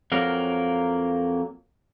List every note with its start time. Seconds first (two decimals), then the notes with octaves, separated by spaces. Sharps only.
0.12 F2 F#3 A#3 A#4